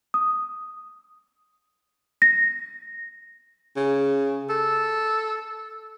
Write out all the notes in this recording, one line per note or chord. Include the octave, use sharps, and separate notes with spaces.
D#6
A#6
C#3
A4